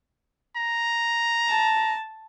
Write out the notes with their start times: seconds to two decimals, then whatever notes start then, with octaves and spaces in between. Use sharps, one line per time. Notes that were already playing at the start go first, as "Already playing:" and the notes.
0.57 A#5
1.49 A5